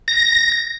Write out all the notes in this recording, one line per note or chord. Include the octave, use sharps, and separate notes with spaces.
A#6